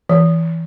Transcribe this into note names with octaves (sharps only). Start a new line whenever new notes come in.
E3